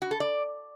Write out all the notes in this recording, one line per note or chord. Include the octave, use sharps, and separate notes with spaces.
F#4
A4
D5